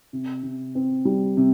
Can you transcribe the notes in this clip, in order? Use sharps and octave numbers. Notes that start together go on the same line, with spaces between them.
C3
C3
C4
G3
C3